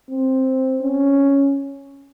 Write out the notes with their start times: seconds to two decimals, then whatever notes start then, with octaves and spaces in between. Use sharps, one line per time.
0.10 C4
0.82 C#4